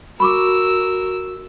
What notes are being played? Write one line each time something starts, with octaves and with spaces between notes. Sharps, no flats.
F#4 A#4 B5 C#6 D6 E6